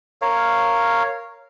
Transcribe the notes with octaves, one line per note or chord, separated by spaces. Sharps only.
A#4 C#5 F5